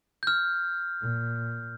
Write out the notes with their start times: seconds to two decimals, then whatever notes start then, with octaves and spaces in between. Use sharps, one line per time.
0.23 F6 G6
1.02 A#2